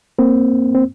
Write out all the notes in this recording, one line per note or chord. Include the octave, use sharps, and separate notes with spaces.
A#3 C4
C4